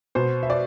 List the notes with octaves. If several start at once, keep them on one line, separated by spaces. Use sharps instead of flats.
B2 C5
E5
D5